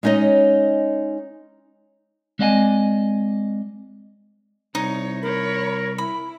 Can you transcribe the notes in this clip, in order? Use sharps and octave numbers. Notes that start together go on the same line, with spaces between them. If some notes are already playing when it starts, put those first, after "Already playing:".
G#3 C#4 D#4 C#5 D#5
G#3 C4 D5 D#5 F5 G#5
C2 D#4 C#5
A#4 C#5 B5
E4 B5